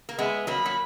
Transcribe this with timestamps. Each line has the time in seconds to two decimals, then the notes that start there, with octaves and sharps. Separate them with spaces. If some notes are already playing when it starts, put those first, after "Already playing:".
0.09 A#3
0.18 G#3 B3 E5
0.47 F#3 A#3 B5
0.66 F#3